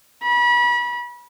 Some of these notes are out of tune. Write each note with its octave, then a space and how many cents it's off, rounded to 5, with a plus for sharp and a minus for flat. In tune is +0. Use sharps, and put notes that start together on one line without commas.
B5 -35